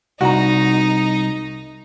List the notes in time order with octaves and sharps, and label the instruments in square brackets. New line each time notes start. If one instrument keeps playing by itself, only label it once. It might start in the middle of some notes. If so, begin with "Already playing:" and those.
[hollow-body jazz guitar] C2 [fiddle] D#4 [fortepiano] F#4 A#5